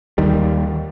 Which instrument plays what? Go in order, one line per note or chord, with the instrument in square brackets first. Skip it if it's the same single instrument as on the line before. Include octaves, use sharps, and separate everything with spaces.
[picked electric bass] D#2 D#3 G3